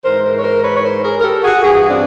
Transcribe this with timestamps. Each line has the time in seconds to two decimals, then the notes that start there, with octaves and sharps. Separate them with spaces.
0.05 G#2 E3 A#4 C5
0.24 A#4 C5
0.39 C#5
0.44 A#4 C5
0.64 B4 C#5
0.77 C#5
0.84 A#4 C5
1.04 G#4 A#4
1.20 A#4
1.23 G4 A4
1.44 F#4 G#4
1.63 G2 E3 F#4 G#4
1.90 C4 D4